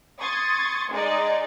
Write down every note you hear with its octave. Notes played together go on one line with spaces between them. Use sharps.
C6 C#6 D#6 G#6 A6
G#3 D#4 G#4 D5 D#5